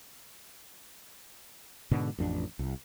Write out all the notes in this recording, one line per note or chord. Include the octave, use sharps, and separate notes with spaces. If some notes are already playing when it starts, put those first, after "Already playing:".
G#2 B2 D3
A1 F2 D4
C2